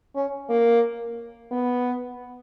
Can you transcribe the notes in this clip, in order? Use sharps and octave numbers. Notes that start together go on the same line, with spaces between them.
C#4
A#3
B3